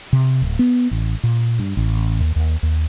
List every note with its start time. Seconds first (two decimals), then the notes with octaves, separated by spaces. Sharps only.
0.13 C3
0.42 D1
0.59 B3
0.91 A1
1.23 A#2
1.59 G2
1.77 A1
2.20 D#2
2.36 D#2
2.63 D#2